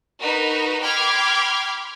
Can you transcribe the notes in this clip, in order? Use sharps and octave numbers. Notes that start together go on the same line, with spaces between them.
D#4 F#4 A#4 B4
G5 B5 C6 D6 F6 G#6